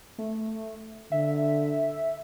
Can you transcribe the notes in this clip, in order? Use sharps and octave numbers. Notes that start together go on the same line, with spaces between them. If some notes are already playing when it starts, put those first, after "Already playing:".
A3
D3 E5